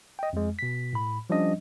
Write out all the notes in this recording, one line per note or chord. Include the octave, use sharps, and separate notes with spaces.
D#5 G5
F2 G#3
B2 B6
A2 B5
F3 G3 C#4 D4 D#5